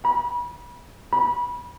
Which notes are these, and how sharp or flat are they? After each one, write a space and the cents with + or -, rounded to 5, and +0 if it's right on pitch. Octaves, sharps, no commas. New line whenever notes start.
B5 -30
B5 -25